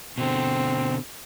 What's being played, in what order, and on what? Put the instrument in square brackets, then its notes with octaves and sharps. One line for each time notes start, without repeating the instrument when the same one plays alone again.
[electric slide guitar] B2 D3 [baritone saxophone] C4